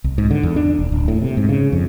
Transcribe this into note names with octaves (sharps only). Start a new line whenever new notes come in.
C2
G#2
D3
E2
D4
D#1
D1
A2
C3
G#2
C#3
F2